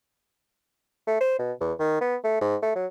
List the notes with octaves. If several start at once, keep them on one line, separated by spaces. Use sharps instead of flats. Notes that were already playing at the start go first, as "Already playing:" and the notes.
A3
C5
B2
E2
D#3
B3
A3
G#2
A3
F#3